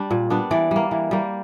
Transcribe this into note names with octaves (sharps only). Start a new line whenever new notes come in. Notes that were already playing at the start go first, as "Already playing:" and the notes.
Already playing: G3 D4
A#2
G3 B3 D4
E3 D5
G3 A#3
E3
G3 A#3